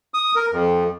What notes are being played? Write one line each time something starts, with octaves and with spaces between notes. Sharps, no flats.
D#6
A#4
F2